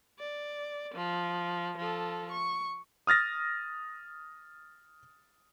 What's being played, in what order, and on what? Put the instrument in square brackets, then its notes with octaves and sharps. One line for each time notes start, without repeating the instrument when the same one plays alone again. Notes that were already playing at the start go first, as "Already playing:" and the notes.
[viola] D5
F3
F3 A4
C#6
[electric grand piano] D#6 F6 A6 A#6